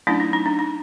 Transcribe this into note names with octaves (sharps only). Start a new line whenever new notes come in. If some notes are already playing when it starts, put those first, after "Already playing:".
F#3 A3 C#4 D4 E4
D#4
D#4
D4
D#4